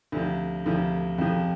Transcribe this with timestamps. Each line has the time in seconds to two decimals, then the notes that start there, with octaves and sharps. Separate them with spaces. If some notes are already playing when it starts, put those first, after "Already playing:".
0.12 D2 C3 F3
0.66 D2 C3 F3
1.18 F2 C3 F3